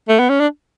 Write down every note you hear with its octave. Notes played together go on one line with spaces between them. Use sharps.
A3
B3
C#4
D4